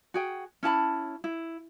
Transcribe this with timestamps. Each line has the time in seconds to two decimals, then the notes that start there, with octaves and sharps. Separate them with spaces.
0.14 F#4 G#4 G5
0.63 C#4 E4 A5 B5
1.24 E4